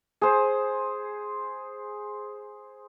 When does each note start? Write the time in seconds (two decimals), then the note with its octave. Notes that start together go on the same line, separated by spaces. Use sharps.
0.21 G#4 C5